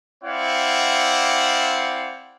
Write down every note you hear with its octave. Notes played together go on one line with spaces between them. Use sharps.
C4 E4 D5 F5 F#5